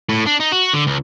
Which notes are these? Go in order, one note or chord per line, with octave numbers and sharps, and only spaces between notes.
A2
D4
D#4
F#4
D3
C#2